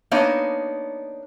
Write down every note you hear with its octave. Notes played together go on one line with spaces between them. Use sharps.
A#3 B3 D4 D#4 C#5